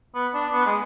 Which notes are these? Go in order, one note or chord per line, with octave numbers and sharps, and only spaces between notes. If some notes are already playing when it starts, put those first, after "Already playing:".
B3
D4
B3
G#3